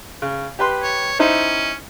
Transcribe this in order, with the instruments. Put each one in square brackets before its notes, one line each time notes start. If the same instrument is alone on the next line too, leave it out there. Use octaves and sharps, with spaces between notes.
[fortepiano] C#3
G4 B4 C6
[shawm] C#5
[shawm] C#4 [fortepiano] D#4 E4 C5